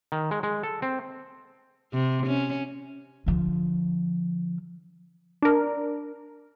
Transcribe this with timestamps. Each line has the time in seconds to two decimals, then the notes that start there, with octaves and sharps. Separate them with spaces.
0.12 D#3
0.31 G#3
0.43 G#3
0.63 A4
0.82 C4
1.93 C3
2.27 C#4
3.26 D3 F3
5.42 D4 A#4